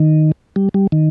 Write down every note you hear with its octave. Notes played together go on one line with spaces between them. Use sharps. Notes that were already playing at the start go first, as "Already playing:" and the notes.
Already playing: D#3
G3
G3
D#3